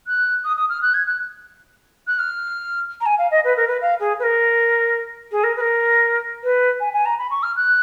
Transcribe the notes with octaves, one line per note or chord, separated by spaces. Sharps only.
F#6
D#6
D#6
F6
F#6
G#6
F#6
F#6
F6
A#5
G#5
F5
D#5
B4
A#4
B4
F5
G#4
B4
A#4
G#4
A#4
B4
A#4
B4
G#5
G#5
A#5
B5
C#6
F6
F#6